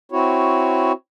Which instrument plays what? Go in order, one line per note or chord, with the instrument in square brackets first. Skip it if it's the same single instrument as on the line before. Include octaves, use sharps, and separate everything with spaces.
[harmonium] C4 E4 F#4 C#5